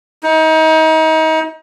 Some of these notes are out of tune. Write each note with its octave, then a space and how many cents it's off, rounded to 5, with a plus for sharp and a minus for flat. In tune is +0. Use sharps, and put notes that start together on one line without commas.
D#4 +35